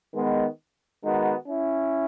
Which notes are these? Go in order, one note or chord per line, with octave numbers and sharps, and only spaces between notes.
D#3 G#3 B3
D#3 G#3 B3 D#4 F#4
C#4 E4